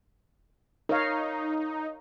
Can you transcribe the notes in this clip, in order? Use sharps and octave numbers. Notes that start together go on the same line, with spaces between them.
D#4 A#4 C#5 F5